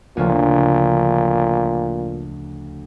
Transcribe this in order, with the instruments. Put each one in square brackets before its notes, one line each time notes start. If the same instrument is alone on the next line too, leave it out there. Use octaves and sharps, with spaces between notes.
[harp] D2 C#3 F3 [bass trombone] A#2